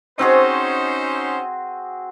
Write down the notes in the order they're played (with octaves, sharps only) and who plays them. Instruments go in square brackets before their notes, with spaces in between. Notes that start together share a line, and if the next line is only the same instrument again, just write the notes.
[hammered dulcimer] C4 F#4 G#4 [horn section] C#4 D#4 C5